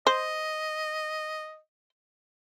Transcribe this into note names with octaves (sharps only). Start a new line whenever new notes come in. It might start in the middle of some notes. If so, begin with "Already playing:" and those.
C5 D#5